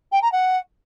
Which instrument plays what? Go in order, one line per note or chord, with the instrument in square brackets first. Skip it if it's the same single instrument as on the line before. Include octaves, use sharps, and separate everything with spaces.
[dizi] G5
A#5
F#5